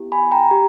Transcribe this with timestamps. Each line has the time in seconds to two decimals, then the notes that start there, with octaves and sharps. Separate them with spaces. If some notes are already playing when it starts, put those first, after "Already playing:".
Already playing: B3 E4 G4
0.12 G#5 B5
0.32 G5 A#5
0.51 G4